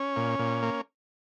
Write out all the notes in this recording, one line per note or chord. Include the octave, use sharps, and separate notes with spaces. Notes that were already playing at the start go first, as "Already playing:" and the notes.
Already playing: C#4
A#2
A#2
A#3